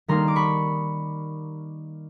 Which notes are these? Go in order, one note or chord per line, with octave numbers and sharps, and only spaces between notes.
D#3 G3 A#3 D#4 A#5 C6
D6
B5 C#6